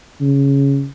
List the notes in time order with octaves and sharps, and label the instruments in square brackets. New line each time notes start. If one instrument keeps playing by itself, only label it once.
[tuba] C#3